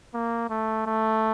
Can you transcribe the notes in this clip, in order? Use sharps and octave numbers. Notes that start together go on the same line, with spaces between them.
A#3
A3
A3